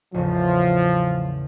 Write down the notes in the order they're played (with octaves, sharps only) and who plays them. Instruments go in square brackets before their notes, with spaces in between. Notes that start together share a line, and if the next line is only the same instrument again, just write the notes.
[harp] A1 E2 C#3 [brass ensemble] F3